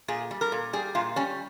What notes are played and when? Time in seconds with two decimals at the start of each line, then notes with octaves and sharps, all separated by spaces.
0.08 A#2 G#4
0.31 G3
0.41 A#4
0.52 A#2
0.73 G3 G#4
0.95 A#2 F4
1.16 G3 C#4